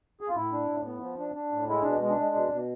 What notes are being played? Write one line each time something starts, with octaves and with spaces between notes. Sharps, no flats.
G#4
F4
A2 E4
D4
A2
B3
F3
D4
D4
A2
G#3 E4
B2 D4
G#3
D4
G#3
B2
B2